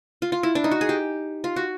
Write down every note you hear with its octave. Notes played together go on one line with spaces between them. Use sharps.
F4
F4
E4
D4
D#4
F#4
G#4
G4
F4
F#4